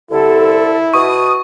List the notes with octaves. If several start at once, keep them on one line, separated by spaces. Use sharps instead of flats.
C2 D3 E4 A4
B2 C#6 D#6